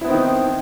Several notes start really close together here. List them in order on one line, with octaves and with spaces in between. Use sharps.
E4 B3 C4 D#3